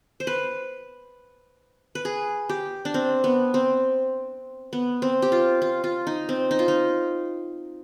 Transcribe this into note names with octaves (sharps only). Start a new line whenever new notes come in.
C5
B4
B4
G#4
G4
D4
C4
B3
C4
B3
C4
G4
F4
F4
F4
D#4
C4
D#4
F4
D#4